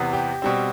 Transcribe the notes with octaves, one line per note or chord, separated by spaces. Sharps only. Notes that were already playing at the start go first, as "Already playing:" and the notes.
Already playing: E2 C3 E3 B3
G4
B2 G3 C4